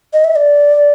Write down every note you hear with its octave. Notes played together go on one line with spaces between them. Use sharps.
D#5
E5
D5